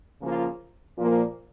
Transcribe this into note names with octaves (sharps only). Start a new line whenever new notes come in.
C#3 F3 A#3 F4
A#2 F3 A#3